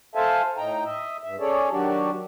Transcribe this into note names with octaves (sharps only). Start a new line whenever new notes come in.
A4 C5 E5 F5 G#5 A5
A2 D#4 G5 A#5
D#5 E5
G2 E5
C#4 G#4 A4 C#5 D5
D#3 F#3 D4 F#4 G4 D5